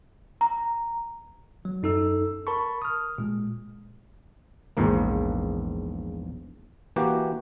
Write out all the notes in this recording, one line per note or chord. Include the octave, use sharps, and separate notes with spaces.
A#5
F#3
F#2 D#4 A4 E6
A#4 A5 B5 C#6
D#6 F6
A#2 G#3
A#1 E2 G#2 F3 A#3
E3 A#3 F#4 G4